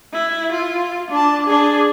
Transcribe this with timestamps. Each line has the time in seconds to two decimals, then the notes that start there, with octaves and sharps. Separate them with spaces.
0.13 E4
0.52 F4
1.11 D4 A5
1.47 D4 G#4